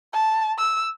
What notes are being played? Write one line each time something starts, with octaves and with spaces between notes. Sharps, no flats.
A5
E6